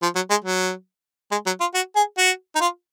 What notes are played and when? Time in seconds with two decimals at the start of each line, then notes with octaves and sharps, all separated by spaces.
0.02 F3
0.15 F#3
0.30 G#3
0.44 F#3
1.31 G#3
1.46 F#3
1.60 F4
1.74 F#4
1.96 G#4
2.18 F#4
2.55 D#4
2.60 F4